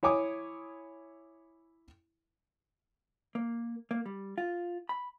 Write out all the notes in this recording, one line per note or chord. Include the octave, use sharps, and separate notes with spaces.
E4 C#5 G#5 D6 D#6
A#3
A#3
G3
F4
B5